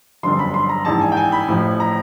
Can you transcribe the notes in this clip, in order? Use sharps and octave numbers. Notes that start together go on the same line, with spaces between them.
G1 F#2 D3 F3 C6
B5
C6
A#5
A#1 G#2 E3 A5
G#5
G5
G#5
B5
A1 A2 F3
A#5